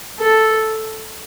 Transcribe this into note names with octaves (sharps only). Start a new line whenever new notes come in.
A4